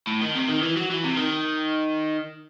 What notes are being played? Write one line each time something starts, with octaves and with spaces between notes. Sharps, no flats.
A2
D#3
C3
D#3
E3
F#3
E3
C3
D#3